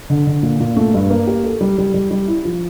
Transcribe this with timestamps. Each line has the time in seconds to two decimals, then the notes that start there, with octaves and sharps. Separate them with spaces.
0.10 D3
0.27 D3
0.43 A#2
0.60 A#2
0.77 A3
0.94 G2
1.10 A#3
1.27 G4
1.44 A4
1.61 G3
1.78 G3
1.94 G3
2.11 G3
2.28 E4
2.45 F3